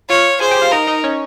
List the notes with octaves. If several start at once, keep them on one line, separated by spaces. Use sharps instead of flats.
F4 C#5 F5
G#4 C5 G#5
G4 G5
F4 F5
D#4 A#4 D#5
D#4 D#5
C#4 C#5